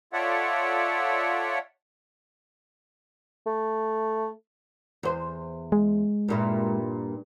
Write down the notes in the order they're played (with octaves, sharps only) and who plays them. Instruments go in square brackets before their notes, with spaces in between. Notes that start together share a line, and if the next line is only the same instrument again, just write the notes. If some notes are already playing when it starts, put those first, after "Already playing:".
[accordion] F4 A4 C#5 D5 E5 F#5
[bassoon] A3
[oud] E2 C5
[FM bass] G#3
[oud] G2 A#2 E4